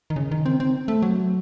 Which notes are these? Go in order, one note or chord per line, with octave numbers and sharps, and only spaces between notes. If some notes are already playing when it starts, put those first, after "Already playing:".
D#3
C#3
D#3
C4
C4
A3
F#3